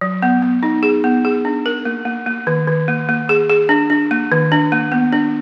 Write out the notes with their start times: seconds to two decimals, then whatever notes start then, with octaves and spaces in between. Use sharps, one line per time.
0.01 F#3
0.22 B3
0.42 B3
0.63 D#4
0.83 G#4
1.04 B3
1.25 G#4
1.45 D4
1.66 A#4
1.85 A#3
2.05 A#3
2.26 A#3
2.47 D#3
2.67 D#3
2.88 A#3
3.09 A#3
3.29 G#4
3.49 G#4
3.69 D4
3.90 D4
4.11 A#3
4.32 D#3
4.52 D4
4.72 A#3
4.92 B3
5.13 D4